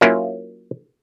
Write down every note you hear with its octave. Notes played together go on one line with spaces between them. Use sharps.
F#3 A#3 C#4 E4 F4